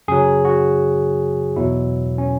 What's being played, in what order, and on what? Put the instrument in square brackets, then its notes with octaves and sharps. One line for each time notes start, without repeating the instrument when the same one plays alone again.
[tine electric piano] F#2 C#3 F#3 G#4
F#4
E2 B2 F#3 E4
C#4